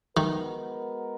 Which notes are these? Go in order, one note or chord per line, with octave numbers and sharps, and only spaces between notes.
D#3 G#3 B3 F#4 A#4